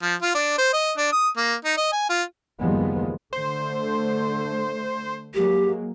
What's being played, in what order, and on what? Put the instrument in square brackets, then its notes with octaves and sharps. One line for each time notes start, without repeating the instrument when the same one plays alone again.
[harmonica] F3
F4
D4
C5
D#5
D4
D#6
A#3
D#4
D#5
G#5
F4
[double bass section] F#1 D#2 F3 G3 G#3 B3
[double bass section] D3 A3 [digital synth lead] C5
[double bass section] F#3 G#3 A#3 [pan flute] G4